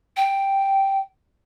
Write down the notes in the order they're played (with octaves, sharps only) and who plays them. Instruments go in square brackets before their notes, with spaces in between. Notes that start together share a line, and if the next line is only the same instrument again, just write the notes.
[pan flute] G5